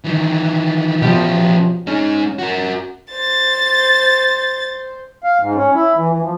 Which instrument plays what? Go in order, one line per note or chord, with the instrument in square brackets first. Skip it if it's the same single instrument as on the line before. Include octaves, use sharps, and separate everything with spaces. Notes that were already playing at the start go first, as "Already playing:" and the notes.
[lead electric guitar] D#3 E3
[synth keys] B2 F3 [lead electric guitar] C#4 G4
[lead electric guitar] G#3 D#4 [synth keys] C#4
[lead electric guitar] F#4 A#4
[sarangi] C5 [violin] A6
[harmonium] F5
G#2
C#4
E4
E3
E3
F3